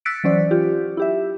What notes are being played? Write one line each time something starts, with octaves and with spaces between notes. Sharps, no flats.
E6 F#6 A6 B6 C#7 D7
E3 F#3 C#4 C5 D5
F4 G4
E4 G4 E5